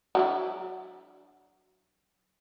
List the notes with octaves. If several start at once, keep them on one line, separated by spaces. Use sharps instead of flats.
F#3 D4 E4